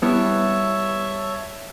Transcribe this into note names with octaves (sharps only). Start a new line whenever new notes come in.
G3 B3 E4 C#5 E5 A5